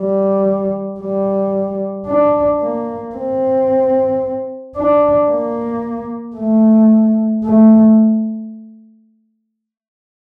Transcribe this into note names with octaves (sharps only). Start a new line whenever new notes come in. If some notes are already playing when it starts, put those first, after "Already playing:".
Already playing: G3
G3
D4
A#3
C4
D4
A#3
A3
A3